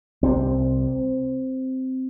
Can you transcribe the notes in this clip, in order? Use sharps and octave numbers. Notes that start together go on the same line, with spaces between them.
C2 C3 C4